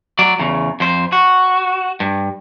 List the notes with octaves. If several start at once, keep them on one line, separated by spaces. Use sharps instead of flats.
F#3 D5
E2 C#3
F2 C5
F#4
G2